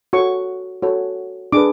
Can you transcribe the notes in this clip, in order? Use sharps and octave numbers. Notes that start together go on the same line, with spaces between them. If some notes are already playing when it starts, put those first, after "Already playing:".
F#4 A4 C#5 C#6
F#4 A4 C#5
D4 G#4 B4 D6